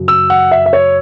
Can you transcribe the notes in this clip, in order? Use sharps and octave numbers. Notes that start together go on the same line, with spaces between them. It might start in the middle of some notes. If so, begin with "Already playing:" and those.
Already playing: F#2 C#3 F#3
E6
F#5
E5
E5
C#5